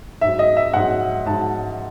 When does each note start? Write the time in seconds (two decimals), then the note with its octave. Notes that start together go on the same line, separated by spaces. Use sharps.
0.21 G#2 F#3 E5
0.39 D#5
0.57 E5
0.73 G#2 F#3 F#5
1.26 G#2 F#3 A5